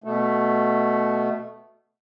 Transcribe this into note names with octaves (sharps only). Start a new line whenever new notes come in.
B2 A3